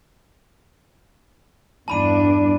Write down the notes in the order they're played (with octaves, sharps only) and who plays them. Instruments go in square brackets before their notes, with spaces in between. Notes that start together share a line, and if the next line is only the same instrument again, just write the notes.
[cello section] E2 G2 D4 [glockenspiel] A5 B5 D#7